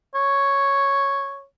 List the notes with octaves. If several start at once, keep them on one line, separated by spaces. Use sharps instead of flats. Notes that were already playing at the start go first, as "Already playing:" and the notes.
C#5